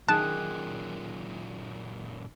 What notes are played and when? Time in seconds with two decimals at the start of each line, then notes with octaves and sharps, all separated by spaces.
0.08 F#2 A#2 D#3 G#4 A5 F#6